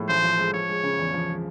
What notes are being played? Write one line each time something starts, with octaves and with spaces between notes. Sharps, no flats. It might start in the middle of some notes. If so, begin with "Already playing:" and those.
Already playing: A2 F3 G#3
A1 C5
F3
G#3
F3 C#5
G#3
C#3
E2
F3
G#3